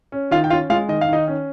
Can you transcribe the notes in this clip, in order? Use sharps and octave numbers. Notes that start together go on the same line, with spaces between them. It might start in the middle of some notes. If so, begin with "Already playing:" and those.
C#4
D#3 F4 F5
G5
C#4 F4 F5
G#3 F4 F5
D#3 D#5
F5
D#3 D#4 D#5
C#4